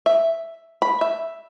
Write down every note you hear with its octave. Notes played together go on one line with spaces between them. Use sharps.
E5
B5
E5